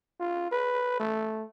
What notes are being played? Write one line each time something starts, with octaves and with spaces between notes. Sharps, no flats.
F4
B4
A3